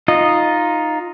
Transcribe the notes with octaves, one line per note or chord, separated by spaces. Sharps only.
D#4 F4 D#5